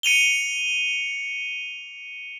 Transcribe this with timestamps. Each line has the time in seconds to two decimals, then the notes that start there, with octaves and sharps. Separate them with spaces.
0.03 C#7 D#7 F7 G7